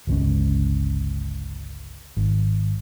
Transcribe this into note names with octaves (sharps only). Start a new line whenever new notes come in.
G1 C#2 G#3 C#4
G#1